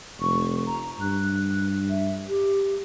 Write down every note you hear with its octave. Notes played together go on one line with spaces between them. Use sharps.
F1 C#6
A#5
G2 F#6
E5
G4